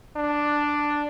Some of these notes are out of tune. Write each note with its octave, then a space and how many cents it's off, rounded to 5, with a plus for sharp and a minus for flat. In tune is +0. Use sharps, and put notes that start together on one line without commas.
D4 +5